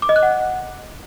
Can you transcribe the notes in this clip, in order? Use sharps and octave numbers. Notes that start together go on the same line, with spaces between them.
D6
D#5
F#6
F#5